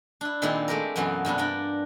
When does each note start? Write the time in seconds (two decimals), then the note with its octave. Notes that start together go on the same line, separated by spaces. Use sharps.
0.21 D4 E4
0.42 A#2 D#3 G#3 C4 E4 F4
0.68 G#3 A3 G4 A#4
0.96 F#2 B2 E3 F#3 B3 F4
1.25 G2 C3 B3 D4
1.38 D4 A#4 D5 G5